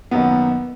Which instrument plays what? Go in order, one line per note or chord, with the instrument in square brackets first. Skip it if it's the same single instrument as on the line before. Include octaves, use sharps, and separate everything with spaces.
[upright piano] F#2 D#3 F#3 A#3 D#4 [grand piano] B3